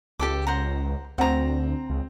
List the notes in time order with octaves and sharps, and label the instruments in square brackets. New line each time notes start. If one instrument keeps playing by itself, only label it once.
[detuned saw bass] C#2 [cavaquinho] G4 A4 D6
[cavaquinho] C5 F#5 A#5
[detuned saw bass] D2 [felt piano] C4 [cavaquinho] F#5 A#5
[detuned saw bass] C#2